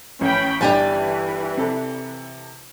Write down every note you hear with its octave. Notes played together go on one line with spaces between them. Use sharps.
A1 C#4 G5 B5
G1 E3 D4 G4 G#5 A5
C3 A4